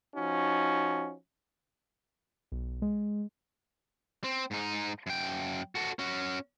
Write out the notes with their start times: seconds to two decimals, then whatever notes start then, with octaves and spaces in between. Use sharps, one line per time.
0.15 F3 C#4 D#4 F#4
2.52 B1
2.82 G#3
4.24 C4
4.51 G#2 D#4
5.07 F#2 G5
5.75 F#4 A4
5.99 C#4 F#4